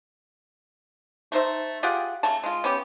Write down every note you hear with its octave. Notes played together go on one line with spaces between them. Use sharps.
A3 D#4 C5 E5
F4 G4 G#4 F#5
C#3 A3 A5
G#3 F4
B3 C#4 G4